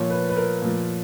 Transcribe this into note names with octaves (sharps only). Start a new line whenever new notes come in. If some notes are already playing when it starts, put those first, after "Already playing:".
Already playing: A#2 F3 C#5
B4
B4
A#4
A#2 F3